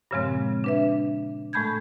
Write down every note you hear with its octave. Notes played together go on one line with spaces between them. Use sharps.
G2 A#2 C#3 F3 G#3 C4
D4 B4 E5
A2 G#3 A3 B5 G6 G#6